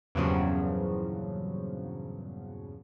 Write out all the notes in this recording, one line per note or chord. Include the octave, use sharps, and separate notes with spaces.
E2 G2 A#2 C#3 F3 F#3